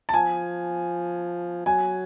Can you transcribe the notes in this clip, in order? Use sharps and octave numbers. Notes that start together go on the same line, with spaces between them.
A5
F3 G#5
F#3 G#5